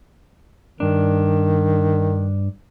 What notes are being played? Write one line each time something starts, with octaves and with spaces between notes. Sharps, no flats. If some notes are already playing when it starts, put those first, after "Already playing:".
G2 D#3 D4